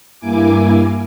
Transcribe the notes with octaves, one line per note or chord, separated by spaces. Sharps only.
G2 A#3 E4 G#5 D6